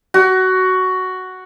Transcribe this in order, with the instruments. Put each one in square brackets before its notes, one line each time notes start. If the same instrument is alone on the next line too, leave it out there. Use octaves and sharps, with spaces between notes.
[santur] F#4